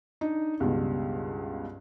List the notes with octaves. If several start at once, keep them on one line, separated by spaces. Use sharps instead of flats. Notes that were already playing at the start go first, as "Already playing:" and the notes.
D4 D#4
C#2 G2 B2